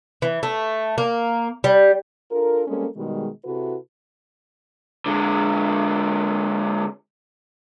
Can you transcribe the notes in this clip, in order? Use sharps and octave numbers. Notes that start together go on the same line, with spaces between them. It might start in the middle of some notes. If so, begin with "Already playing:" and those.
E3
A3
A#3
G3
D4 F4 A4 A#4
G3 G#3 A#3 C4 C#4 A4
B2 D#3 G3 G#3
C3 E4 F#4 A4 B4
D3 G#3